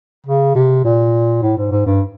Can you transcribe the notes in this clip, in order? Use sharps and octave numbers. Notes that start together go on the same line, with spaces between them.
C#3
C3
A#2
A2
G#2
G#2
G2